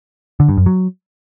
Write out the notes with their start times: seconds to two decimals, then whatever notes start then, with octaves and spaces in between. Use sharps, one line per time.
0.40 D3
0.49 G2
0.57 F#2
0.66 F#3